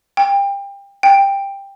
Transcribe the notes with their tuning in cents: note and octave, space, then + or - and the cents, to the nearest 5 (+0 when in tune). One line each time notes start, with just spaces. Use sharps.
G5 +25
G5 +10